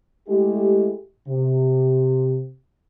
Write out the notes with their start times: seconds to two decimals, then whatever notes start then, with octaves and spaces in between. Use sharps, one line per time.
0.28 G#3 A3 E4 G4
1.28 C3